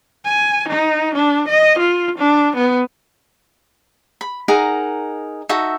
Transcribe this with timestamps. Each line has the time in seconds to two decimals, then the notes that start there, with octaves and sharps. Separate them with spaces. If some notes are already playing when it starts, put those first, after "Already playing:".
0.25 G#5
0.69 D#4
1.14 D4
1.49 D#5
1.79 F4
2.18 D4
2.56 B3
4.21 B5
4.48 D#4 G#4 A#4 F#5
5.49 D#4 F#4 A4 E5